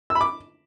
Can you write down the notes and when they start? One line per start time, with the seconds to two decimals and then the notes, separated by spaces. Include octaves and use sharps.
0.10 E6
0.15 B5
0.21 D6